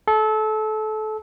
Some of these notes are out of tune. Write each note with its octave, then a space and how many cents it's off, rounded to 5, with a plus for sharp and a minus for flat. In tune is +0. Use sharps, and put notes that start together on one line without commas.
A4 -25